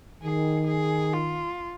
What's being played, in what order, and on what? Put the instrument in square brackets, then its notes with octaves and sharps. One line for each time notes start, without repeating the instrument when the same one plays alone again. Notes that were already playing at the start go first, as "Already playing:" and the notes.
[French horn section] D#3 [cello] G#4
[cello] G#4
F4